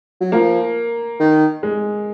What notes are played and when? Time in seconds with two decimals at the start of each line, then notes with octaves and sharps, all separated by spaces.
0.21 F#3
0.32 F3 A#3
1.19 D#3
1.63 G#3